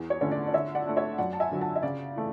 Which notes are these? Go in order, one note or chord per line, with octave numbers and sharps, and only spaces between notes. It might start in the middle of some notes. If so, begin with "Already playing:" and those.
Already playing: E2
C#5
D3 A3 C#4 C#5
D5
D5
D3 C#5 E5
D5 F#5
A3 D4
C#5 E5
F#2 D5 F#5
A5
E5 G#5
D3 F#3
F#5 A5
E5
C#3 D5
E3 A3